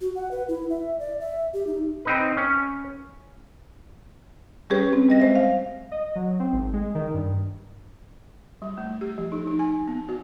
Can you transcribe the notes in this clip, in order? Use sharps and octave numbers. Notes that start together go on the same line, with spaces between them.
F#4
F#5
B4
E4
E5
D5
E5
G4
D#4
C4 D#4 B4
C#4
G3 C#4 G4 G#4 B4 C#5
C4
G3 D#5 A#6
G#3 C5 E5
F5
D#5
F#3
C4
G#1
G#3
D#3
G2
G3
A3
G4
F3
D#4
D#4
G#5
B3
F#4